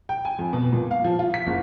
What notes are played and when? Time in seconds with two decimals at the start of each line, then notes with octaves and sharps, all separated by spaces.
0.09 G5
0.25 G#5
0.39 F2
0.53 B2
0.73 A#2
0.91 F5
1.04 F3
1.19 F4
1.34 B6
1.47 F#1